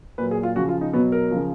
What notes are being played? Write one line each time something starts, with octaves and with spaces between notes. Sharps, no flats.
A#2 F#3 B4
G#4
F4
C#3 F3 F#4
F4
D#4
B2 F#3 B3
A#4
C#3 F3